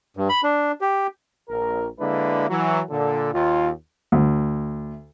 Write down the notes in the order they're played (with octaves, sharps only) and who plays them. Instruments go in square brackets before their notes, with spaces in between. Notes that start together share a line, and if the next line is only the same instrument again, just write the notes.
[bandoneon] G2
B5
D4
G4
[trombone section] A#1 A#4
D3 G#3 A#3 D4 E4 B4
E3 F#3
A#2 D3 A4
D#2 F4
[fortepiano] D2